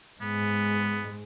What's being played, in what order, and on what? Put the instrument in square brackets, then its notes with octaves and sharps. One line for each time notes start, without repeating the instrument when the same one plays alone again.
[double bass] G#2 G#3 [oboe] B3